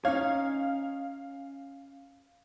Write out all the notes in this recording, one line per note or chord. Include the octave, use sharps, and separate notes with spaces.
C#4 D#4 C#5 F5